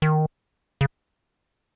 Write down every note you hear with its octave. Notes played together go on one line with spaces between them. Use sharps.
D#3
C#3